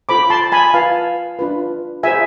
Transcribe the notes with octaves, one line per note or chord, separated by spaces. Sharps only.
F4 A4 C5 B5 D6
A5 C6
G#5 B5
F4 B4 F5 A5
D4 F4 B4
F4 G#4 C5 E5 G#5